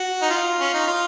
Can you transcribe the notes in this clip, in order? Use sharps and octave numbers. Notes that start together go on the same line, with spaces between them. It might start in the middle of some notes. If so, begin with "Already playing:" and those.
Already playing: F#4
D#4
F4
C#4
D#4
F4